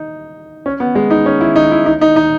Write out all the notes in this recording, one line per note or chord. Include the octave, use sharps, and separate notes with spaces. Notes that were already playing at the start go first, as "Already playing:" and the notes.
Already playing: D#4
C#4
B3
G#3
D#4
C#4
E4
D#4
E4
D#4
D#4
D#4